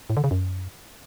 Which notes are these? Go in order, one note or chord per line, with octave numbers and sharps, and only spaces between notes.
A2
D3
C#3
F#2